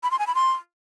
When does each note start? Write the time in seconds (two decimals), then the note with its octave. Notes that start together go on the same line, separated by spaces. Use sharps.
0.03 B5
0.11 C6
0.19 G#5
0.27 B5
0.35 C6